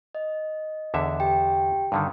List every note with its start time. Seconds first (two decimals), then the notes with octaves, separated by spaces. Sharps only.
0.15 D#5
0.94 E2 D3 E5
1.20 G4 G5
1.92 G2 D3 D#3